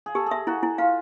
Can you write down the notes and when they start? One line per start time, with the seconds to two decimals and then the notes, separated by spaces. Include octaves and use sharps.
0.06 G#4
0.15 G4 A4
0.26 G#4
0.31 E5
0.47 E4 F#4
0.63 E4
0.78 F4 F5